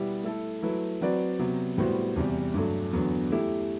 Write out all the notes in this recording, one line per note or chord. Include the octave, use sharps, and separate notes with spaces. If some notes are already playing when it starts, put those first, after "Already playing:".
Already playing: B2 G3 B3 E4 G4
A3 E4 A4
F#3 A3 E4 B4
F#3 C4 F#4 B4 D5
C3 F#3 B3
A2 G3 B3 F#4 C5
E2 C3 G3
G2 F#3 A3
E2 D3 F#3 B3
A3 E4 G4